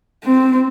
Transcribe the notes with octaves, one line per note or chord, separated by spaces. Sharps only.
C4